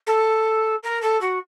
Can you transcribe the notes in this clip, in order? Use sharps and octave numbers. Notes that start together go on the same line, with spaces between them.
A4
A#4
A4
F#4